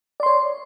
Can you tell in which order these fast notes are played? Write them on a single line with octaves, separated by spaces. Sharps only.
D5 C6 C#5